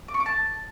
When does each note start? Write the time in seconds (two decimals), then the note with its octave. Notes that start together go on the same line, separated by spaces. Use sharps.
0.08 D6
0.14 C#6
0.20 D6
0.26 A5